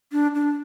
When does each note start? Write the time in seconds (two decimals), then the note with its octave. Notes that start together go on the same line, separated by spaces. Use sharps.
0.12 D4
0.35 D4